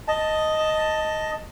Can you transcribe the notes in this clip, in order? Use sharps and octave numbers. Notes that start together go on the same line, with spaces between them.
D#5 A5